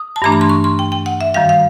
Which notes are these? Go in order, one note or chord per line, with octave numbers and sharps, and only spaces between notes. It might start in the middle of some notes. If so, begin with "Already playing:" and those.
Already playing: D#6
A5
G2 E3 A3 D4 A#5
B5
C6
C#6
C6
G5
G5
F#5
E5
F#2 D#3 G3 F5
F5